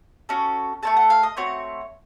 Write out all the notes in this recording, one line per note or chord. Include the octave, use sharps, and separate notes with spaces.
C#4 F#4 A4
A3 C#4 A4 A5
F#5
F5
D#5
A3 C4 F#4 C#5